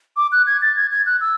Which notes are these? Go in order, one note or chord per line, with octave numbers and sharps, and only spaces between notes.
D6
F#6
G#6
A6
G#6
G#6
F#6
E6